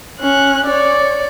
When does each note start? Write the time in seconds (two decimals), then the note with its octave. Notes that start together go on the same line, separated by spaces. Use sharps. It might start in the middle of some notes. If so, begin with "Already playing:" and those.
0.20 C#4 F#6
0.66 C#5 D5